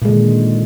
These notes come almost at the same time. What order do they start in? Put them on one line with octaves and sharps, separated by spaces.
A#2 G#3 D3 D#3